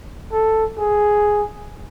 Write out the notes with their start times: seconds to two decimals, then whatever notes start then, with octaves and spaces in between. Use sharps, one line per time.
0.32 A4
0.78 G#4